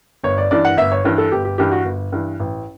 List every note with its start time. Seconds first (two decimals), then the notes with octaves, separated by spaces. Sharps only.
0.24 G1 C#5
0.38 D5
0.51 G2 E3 D5
0.65 F#5
0.77 G1 E5
0.92 C#5
1.05 G2 E3
1.18 A4
1.32 G1 G4
1.45 G4
1.58 G2 E3 G4
1.72 F#4
1.85 G1
2.12 G2 E3
2.40 A1